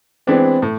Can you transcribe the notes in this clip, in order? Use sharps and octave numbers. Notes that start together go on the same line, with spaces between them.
E3 G#3 B3 C4 D4
A2